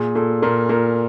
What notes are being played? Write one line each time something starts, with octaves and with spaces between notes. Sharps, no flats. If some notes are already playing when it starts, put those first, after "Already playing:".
Already playing: A#2 G#4
A#2 A4
A#2 A#4
A#2 A#4